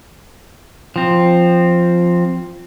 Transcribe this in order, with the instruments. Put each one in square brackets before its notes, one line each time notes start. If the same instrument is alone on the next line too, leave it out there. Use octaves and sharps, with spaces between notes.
[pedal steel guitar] F3 C4